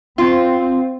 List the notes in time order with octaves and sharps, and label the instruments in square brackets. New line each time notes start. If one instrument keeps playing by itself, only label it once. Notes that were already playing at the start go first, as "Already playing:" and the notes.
[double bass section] C4 [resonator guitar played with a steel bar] F4